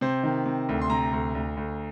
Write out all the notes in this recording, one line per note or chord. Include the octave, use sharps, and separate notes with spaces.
C3 C5
D#3
C3
D2
C6
C3 A#5
D2
D2
D2